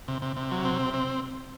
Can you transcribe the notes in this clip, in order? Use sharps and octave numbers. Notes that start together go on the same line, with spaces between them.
C3
C3
C3
F#3
C4
C3
C4